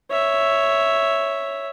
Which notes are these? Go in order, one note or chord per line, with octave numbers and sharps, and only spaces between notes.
C#5 E5